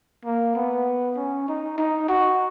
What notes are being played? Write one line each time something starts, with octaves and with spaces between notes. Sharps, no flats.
A#3
B3
C#4
D#4
D#4
F#4